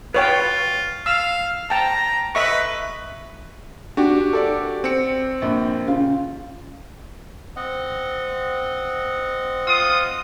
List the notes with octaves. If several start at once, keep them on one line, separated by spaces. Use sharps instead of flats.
F4 B4 C#5 G5
F5 E6
G5 A5 A#5
B4 D#5 E5 C#6
D4 F#4 G4
A4 D5
C4 C#7
A#1
C#3 F4
C4 D#5 F#5
F4 D#6